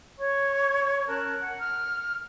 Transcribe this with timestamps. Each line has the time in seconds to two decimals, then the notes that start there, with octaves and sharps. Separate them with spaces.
0.20 C#5 C#6
1.08 C#4 A#4 A5 F#6
1.41 F#5
1.60 F6